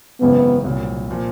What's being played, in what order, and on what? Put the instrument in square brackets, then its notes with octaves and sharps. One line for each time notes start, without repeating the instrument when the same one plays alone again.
[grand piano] G#1 F#2 C#3 E3 [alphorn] B3
[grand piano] C2 A#2 F#3
A#2 F3